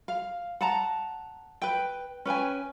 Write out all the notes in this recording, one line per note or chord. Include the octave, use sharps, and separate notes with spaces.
F5
F#5 A5 A#5
B4 G5
C#4 B4 G5 G#5